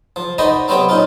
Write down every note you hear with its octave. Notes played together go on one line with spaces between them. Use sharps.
F3
D#4 F#4 B4 C5 D5 D#5
F#3 B3 C4 G4 C#5
A#2 C#4 D#4 F4